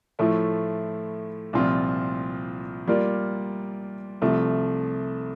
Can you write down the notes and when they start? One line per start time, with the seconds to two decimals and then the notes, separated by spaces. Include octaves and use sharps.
0.19 A2 F3 A3 E4
1.53 C2 A#2 F3 C4 F4
2.87 G3 A#3 F4 A#4 D5
4.22 C2 C3 F3 A3